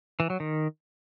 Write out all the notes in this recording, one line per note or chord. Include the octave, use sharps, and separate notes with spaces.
E3
F#3
D#3